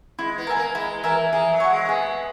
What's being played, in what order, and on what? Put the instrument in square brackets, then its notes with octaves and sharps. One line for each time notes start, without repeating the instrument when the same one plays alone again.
[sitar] G#3 [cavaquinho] E4
[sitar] B3
[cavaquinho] A#4 E5 G#5
[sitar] A#3
[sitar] G#3 [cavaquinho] E4
[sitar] E3 [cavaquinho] A#4 E5 G#5
[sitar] E3 [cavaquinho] G#4
[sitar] F#3
[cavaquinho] C#5 F#5
[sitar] G#3
A#3
[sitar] B3 [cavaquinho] G#4